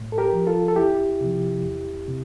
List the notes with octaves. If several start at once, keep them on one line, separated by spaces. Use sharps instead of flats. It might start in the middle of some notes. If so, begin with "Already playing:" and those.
Already playing: A2
A4
G4 A#4
F3
F4 A4
A4
E2 E4 G4
C3 F3
E2
C3